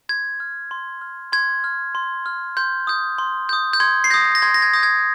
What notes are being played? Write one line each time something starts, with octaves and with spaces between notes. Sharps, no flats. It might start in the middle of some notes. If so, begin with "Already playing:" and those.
C6 G#6
F6
C6
F6
C6 G#6
F6
C6
F6
C6 G6
D#6 G6
C6
D#6 G6
G6
C6 G#6
C7
D#6 G6 A#6
A#6
C6 G#6
A#6
G#6
D#6 G6 A#6
G#6